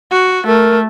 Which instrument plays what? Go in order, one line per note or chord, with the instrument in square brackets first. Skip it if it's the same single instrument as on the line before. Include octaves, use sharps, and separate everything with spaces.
[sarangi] F#4
[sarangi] A3 [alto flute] A#4